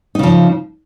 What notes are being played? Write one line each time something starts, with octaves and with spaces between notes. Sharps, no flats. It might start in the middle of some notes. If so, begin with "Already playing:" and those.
C#3 F3 D#4